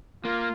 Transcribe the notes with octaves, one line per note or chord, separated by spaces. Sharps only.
A#3 F4